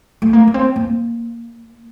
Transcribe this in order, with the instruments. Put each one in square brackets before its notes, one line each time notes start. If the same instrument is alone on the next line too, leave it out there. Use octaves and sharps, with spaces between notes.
[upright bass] A3
A#3
A#3
C4
A#3